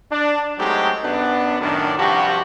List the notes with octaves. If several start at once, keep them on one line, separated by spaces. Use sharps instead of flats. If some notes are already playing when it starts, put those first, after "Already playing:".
D4
F#3 G#3 A3 C4 D#4 G4
F#2 B3 D4
F#2 A2 D#3 D4
C2 G2 F3 D4 F#4 G4